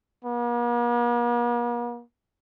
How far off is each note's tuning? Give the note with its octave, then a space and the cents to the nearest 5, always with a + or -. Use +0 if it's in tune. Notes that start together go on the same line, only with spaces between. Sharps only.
A#3 +45